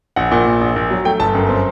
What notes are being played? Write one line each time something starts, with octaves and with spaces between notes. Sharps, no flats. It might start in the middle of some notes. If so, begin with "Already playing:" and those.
A#1 F#5
A#2
A#1
A#1
A#1
F#3
A3 G5
G1 A5
F#2
C4